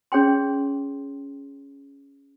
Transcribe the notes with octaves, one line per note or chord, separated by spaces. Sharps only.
C#4 G#4 C#5 G5 C6